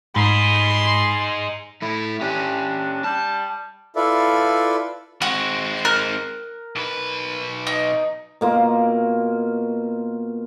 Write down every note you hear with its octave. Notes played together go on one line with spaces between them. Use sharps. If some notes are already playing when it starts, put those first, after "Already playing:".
G#2 G#3 D#4 B5 C6
A3 E4
C#4 D4 G4
G3 A5
E4 F4 A4 B4 D5 E5
G#3 C4 F#4
A#4 F#6
B1 B4
D#4
B2 A#3 F4